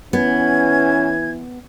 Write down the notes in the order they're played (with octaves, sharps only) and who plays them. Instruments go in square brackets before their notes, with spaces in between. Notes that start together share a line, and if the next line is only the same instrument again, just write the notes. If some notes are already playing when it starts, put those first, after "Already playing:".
[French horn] E3 [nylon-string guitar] B3 [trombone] C#4 [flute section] G#6